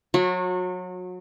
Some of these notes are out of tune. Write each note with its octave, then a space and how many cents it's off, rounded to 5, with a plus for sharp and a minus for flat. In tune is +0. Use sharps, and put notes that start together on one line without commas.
F#3 -25 F#4 -35